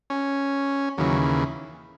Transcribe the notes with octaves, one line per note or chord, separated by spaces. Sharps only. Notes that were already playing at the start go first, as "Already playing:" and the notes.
C#4
D#2 C#3 E3 F#3